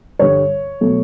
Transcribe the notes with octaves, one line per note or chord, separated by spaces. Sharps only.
G2 D3 G3 C#5
B2 F#3 A3